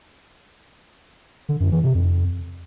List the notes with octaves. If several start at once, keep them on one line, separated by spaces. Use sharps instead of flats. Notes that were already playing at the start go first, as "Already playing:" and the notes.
D3
F#2
E3
C3
F2